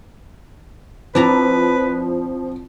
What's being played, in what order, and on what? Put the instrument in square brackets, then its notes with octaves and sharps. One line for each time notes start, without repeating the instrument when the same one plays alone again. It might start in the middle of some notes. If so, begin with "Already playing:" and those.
[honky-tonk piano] F3 [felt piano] C4 [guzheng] D4 E4 A#5 [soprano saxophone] B4